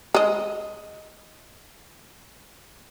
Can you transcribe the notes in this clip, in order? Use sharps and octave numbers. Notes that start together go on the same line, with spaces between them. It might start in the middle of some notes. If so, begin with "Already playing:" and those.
G#3 D#5